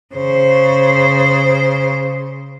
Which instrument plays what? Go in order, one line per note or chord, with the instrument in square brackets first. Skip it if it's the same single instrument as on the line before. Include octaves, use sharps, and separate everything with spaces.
[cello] C#3 C5